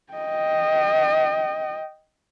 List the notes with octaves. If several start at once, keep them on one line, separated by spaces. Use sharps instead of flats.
D#5 G5